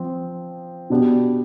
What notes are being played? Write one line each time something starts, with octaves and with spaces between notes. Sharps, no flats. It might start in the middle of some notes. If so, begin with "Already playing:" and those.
Already playing: F3 C4
B2 B3 D4 G4